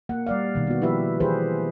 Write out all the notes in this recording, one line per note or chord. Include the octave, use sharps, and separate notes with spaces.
A#3 F#5
G3 D5 F5
B2 D#3
B3 F#4
F3 E4 G4 B4 E5
E3 E4 G4 G#4 B4 C5